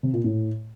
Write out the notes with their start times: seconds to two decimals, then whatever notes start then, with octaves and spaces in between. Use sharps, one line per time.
0.03 C3
0.13 A#2
0.24 A2